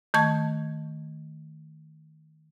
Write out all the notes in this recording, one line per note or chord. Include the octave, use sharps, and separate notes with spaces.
D#3 A3 A5 C#6 G#6